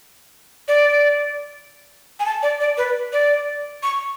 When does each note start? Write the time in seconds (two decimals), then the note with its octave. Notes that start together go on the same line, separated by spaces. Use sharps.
0.68 D5
2.20 G#5
2.26 A5
2.43 D5
2.60 D5
2.77 B4
3.13 D5
3.83 C#6